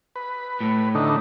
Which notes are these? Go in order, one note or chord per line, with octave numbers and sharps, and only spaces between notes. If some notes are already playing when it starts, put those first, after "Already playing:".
B4
A2
D3 A3 D#4